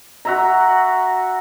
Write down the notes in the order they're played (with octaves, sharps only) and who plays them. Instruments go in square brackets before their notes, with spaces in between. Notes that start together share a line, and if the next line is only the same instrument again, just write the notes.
[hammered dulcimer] F#4 E5 A#5